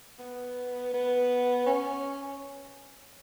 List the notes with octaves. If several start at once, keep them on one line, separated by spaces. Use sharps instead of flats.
B3
B3
C#4